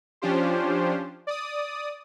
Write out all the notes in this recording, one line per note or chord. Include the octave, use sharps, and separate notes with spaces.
F3 C#4 D4 F4 G4 C5
D5 D#6